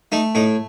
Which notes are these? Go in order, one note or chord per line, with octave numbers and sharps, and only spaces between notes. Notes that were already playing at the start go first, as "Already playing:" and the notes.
A3 D#4
A2 D#4